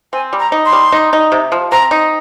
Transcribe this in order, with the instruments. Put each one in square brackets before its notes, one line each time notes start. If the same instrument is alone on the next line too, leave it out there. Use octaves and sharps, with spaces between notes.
[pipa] C4 [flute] G#5
[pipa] G3
[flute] A#5
[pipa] D#4
[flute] C6
[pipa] G3
D#4
D#4
C3
F3
[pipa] C4 [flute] A#5
[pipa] D#4